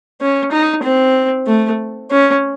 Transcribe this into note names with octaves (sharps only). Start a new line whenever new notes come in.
C#4
D#4
C4
A3
C#4